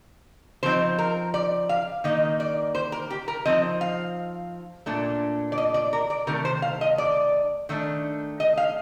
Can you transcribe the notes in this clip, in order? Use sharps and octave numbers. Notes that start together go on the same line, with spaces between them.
F3 C4 D#4 C5
A#4
D5
F5
D#3 A#3 D#4 D#5
D5
C5
A#4
G4
A#4
F3 C4 D#4 D#5
F5
A#2 A3 D4
D5
D#5
D5
A#4
D5
C3 D#3 A3 A#4
C5
F5
D#5
D5
D#3 A3 D4
D#5
F5